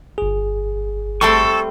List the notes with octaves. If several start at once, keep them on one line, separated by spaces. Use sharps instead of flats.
G1 G#4
G3 A3 C4 A4 C#6